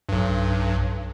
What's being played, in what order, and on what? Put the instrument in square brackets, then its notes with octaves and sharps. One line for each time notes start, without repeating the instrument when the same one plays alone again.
[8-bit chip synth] B1 G2